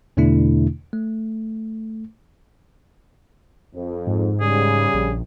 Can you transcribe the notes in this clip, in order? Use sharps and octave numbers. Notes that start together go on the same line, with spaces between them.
E2 B2 D3 A3 D4 E4
A3
F2
G#2
C#3 G3 G#4
A#1